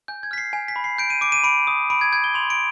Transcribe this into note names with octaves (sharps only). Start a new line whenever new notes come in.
G#5 G6
G#6
F6 B6
C7
G#5
B6
B5
C7
G6 D7
D#7
D6 D7
D#7
B5 D7
D#6
B5 D7
G#6
G6 G#6
G7
C6 F7
D7